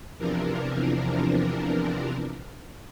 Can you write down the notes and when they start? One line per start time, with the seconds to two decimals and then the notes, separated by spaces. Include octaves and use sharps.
0.17 E2 C3 E3 F3 D4 A#4